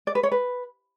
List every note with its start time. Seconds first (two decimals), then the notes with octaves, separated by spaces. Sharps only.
0.07 D5
0.15 B4
0.23 C#5
0.32 B4